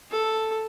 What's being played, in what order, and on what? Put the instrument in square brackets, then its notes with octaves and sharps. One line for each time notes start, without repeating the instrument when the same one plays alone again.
[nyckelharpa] A4